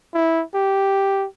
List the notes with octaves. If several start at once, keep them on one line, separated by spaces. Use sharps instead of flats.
E4
G4